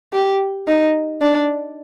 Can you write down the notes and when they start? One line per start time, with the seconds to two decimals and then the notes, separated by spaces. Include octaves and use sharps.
0.13 G4
0.68 D#4
1.21 D4